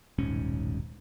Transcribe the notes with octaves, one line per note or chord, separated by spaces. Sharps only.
D#1 B1 G#2 C#4